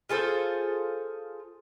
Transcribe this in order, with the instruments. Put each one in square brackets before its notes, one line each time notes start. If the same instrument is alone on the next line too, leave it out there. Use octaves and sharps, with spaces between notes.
[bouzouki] F4 G#4 A4 C5